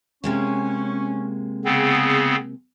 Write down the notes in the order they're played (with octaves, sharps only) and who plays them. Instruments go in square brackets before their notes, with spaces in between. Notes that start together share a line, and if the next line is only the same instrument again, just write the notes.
[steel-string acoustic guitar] C3 G#3 A#3 [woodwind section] C#4
[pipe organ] C#3 B3 C4 [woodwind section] G#4